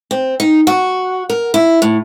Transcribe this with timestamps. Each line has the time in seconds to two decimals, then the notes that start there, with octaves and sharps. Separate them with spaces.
0.11 C4
0.40 D#4
0.67 F#4
1.30 A#4
1.54 E4
1.82 A2